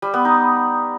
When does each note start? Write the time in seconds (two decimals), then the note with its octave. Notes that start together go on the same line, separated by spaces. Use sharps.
0.02 G3
0.14 B3
0.25 D#4